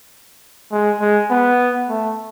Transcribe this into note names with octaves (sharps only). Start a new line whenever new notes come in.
G#3
G#3
B3
A3